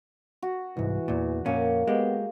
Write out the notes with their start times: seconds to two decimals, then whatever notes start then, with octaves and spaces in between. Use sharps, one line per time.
0.42 F#4
0.77 C2 G#2 E3
1.08 E2 A#2
1.46 F2 A#2 A#3 C#4
1.87 G#3 B3 G4